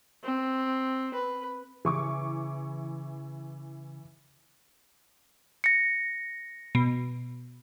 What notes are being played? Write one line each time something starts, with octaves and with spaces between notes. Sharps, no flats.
C4
B4
C#3 E3 G#4 C#6 D6
A#6 C#7
B2